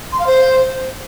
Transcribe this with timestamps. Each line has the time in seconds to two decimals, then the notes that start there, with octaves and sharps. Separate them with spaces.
0.12 C6
0.19 F5
0.26 C5